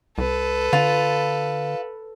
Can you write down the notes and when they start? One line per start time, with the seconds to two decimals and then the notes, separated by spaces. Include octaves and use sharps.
0.18 C2 A4 B4
0.73 D3 F4